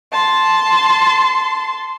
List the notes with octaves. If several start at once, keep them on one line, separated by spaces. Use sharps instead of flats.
A5 C6